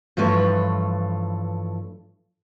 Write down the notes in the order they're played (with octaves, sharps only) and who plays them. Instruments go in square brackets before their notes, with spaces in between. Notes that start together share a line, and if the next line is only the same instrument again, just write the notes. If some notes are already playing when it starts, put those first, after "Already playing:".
[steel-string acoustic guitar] G2 E3 F3 A3 C#5